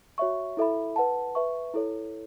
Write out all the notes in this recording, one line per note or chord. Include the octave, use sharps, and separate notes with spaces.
F#4 C#5 E5 C#6
E4 A4 E5 B5
B4 F#5 A5
B4 E5 C#6
E4 A4 C#5